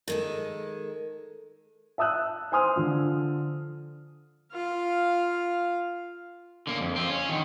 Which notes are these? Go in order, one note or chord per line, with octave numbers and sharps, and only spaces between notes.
D#3 G#3 A4
E5 A5 D#6 E6 F#6
C5 G#5 C6 D#6 F6
D3 F3
F4 F5
D3 A#3
F2
C4 F4
C#4
D3 D#3